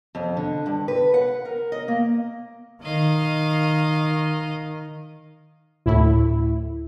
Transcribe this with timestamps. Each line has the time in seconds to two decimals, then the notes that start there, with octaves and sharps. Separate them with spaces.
0.15 F2
0.37 D3
0.66 G2
0.88 B4
1.14 F#5
1.45 A#4
1.72 D#5
1.88 A#3
2.83 D#3 D#5 F5
5.86 D2 A2 E4